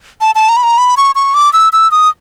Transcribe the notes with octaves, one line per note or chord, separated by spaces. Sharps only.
A5
A5
A#5
B5
A#5
B5
C#6
C#6
D6
E6
E6
D#6